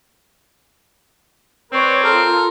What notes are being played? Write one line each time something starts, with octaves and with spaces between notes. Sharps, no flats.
C4 B4 C#5 D5
F4 A4 A#4